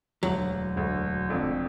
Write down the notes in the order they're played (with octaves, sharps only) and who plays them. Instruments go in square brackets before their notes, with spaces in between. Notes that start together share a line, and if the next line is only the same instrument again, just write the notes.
[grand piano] E1 D2 D3 [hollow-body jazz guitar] F#3
[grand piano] E1 D2 D3
F1 F2 D3